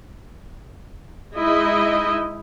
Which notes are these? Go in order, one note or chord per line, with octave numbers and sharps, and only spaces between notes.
G#3 D#4 E4 D#5